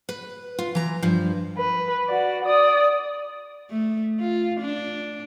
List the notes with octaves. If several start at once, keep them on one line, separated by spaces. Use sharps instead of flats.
B4
F4
E3 A#5
G2 F3
B4
F#4 D5
D5 D#6
A3
F4
D4